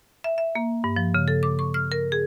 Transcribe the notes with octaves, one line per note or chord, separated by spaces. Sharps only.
E5
E5
A#3
G2
F3
C#3
A4
D6
C#6
F6
A#4
G#4